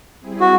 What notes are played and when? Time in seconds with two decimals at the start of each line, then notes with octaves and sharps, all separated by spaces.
0.20 G3 C4 E4 G#4
0.41 F#4